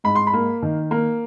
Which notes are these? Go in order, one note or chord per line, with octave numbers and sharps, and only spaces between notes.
G#2 B5
C6
B5
A#3
D#3
A#3